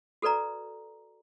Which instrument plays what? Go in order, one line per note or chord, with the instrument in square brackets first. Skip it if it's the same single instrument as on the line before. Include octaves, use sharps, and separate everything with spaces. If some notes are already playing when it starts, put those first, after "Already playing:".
[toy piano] F#4 A4 B4 D5 A#5